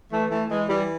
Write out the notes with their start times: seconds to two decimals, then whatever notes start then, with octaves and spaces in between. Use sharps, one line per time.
0.11 E3 A3
0.30 E3 A3
0.49 E3 G#3
0.69 E3 G3